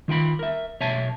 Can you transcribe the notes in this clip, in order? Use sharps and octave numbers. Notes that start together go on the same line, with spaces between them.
D#3 F4 G5 B5
A#4 E5
B1 C#5 E5 G#5 A5